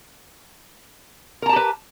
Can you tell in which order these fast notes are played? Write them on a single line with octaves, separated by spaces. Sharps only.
A#4 A#5 A5 G4 B4